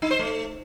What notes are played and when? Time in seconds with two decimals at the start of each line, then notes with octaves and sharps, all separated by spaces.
0.02 D#4
0.11 C5
0.19 A3